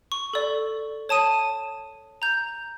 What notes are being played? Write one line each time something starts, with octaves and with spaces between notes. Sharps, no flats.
C#6
A4 D5
C#5 A5 D#6 D#7
A#5 G6